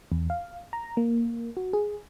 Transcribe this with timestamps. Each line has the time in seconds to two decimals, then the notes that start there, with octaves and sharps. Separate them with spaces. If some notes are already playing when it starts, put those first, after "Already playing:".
0.12 E2
0.30 F5
0.73 A#5
0.97 A#3
1.57 F#4
1.73 G#4